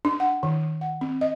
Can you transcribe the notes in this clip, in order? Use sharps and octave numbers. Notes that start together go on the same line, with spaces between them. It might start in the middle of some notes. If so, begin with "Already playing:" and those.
D4
F#5
D#3
F#5
C4
D#5